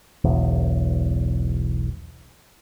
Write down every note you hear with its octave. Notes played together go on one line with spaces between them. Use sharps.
E1 B1 E2